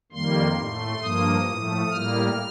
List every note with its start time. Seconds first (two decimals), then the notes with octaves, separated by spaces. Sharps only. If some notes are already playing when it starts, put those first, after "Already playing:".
0.12 F2 D#3 G3 A#3 C6
0.57 A2 A3
1.02 G2 F3 A#3 D#6
1.47 A2 F3 A3
1.91 A2 G3 A#3 F6